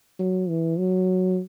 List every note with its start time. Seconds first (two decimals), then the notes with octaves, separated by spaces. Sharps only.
0.19 F#3
0.49 E3
0.78 F#3